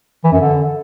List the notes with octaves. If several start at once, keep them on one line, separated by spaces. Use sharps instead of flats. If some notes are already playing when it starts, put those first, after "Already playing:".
E3
F#2
D3